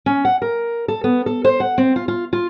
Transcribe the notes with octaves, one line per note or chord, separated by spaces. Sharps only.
C#4
F#5
A#4
A4
B3
A4
C5
F#5
C4
F4
F4
F4